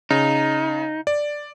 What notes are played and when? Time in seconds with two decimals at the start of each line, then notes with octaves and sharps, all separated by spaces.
0.11 C#3 D#4
1.07 D5